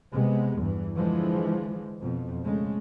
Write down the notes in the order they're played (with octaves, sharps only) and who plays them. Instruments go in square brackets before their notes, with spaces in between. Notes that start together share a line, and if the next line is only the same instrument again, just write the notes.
[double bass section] C3 G#3 B3
E2 G2 E3
D3 E3 F3 G#3
F2 B2
C#3 G#3 A3